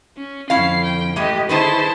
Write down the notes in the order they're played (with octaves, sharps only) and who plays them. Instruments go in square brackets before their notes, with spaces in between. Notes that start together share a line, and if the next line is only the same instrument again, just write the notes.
[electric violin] C#4
[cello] F2 D3 [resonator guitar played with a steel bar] C#4 E4 F5 [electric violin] C7
[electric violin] G5
[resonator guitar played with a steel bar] E3 G#3 [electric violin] A3 [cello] G4 D#5
[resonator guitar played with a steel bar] D3 D#3 B4 [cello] E4 G#4 [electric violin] C5 A5